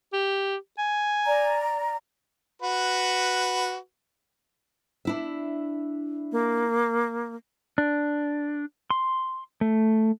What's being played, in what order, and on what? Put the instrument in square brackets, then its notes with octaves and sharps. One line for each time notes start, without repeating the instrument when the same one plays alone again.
[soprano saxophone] G4
G#5
[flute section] D5 A#5
[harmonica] F#4 B4
[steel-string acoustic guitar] D4 E4 E5
[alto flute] A#3
[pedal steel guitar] D4
C6
A3